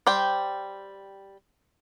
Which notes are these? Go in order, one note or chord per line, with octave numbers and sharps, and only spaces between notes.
G3 C5 G5